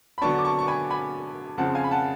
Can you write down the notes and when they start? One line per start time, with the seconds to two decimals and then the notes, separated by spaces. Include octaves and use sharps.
0.18 B5
0.22 D3 F#3 B3 D4 A5 C#6
0.38 D6
0.45 A5 C#6
0.59 C#6
0.68 G#5 B5
0.90 G#5 B5
1.58 F2 C#3 F3 F#5 A5
1.75 F5 G#5
1.84 B5
1.91 F#5 A5